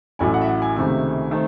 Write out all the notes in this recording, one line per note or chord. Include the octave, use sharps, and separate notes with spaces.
A1 A2 F#3 G#5
F#5
E5
F#5
G#5
C#2 C3 D#3 A3
D#3 A3 C4